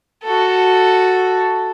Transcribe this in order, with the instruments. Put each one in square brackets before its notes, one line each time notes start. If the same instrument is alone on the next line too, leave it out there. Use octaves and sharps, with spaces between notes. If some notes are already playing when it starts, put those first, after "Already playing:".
[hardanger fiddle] F#4 A4